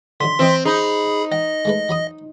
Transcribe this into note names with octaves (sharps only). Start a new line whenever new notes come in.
D3 D#3 F#3 C6 B6
E3 C4 E4 D#5
D#4 G#4 B5
D#5 F#5 G5
G#3 A3 B4
F#3 B5 D#6